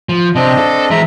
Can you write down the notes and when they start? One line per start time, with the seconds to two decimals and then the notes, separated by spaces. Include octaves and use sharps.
0.09 F3
0.35 C3 C4 D4 D#5
0.58 A4
0.91 E3 G#3 E5 A#5